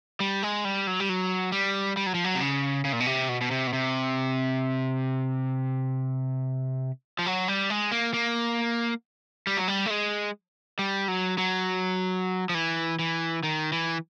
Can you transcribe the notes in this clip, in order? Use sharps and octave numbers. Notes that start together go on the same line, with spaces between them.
G3
G#3
G3
F#3
G3
F#3
G3
G3
F#3
F3
F#3
C3
C#3
C#3
A#2
B2
C3
B2
B2
C3
B2
C3
F3
F#3
G3
G#3
A#3
A#3
G3
F#3
G3
A3
G#3
G3
F#3
F#3
F3
E3
E3
D#3
E3